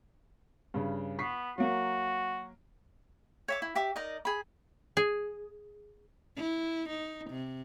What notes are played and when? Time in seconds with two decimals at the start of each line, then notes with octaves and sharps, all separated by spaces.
0.74 G2 C#3
1.19 B3 C#6 B6 C7
1.58 F#3 A#3 F#4
3.48 C#5 E5 D6
3.62 E4
3.75 G4 E5 D6
3.96 D#4 A#4 D5 D#5
4.25 G#4 B5
4.97 G#4
6.36 E4
6.89 D#4
7.31 C3